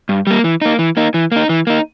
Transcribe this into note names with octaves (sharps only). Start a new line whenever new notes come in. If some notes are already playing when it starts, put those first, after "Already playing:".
G2
G3 A#3
E3
A#3 D#4
E3
A#3 D#4
E3
A#3 D#4
E3
A#3 D#4